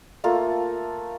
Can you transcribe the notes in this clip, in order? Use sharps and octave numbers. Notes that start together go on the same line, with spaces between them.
A3 A#3 F4 A4